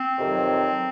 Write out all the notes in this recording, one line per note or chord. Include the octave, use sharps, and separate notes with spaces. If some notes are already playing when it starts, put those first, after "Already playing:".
Already playing: C4
F2 C3 D#3 F#3